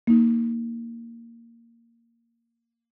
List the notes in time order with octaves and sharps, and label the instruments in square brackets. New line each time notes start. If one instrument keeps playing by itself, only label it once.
[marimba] A#3 D#4